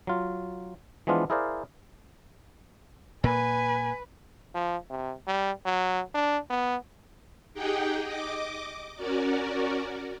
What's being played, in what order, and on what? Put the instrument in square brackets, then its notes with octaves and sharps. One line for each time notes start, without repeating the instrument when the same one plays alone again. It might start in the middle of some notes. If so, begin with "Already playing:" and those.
[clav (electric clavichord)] F#3 F4
E3 F3 G#3 B3 D4 F4
E4 G#4 A#4 C5 D5 F5
[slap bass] A#2 A#3 [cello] B4 [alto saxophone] G#5
[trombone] F3
C3
G3
F#3
D4
B3
[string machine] D#4 G4 G#4 F#5 G5
D#5 D6
C#4 F#4 A#4 D5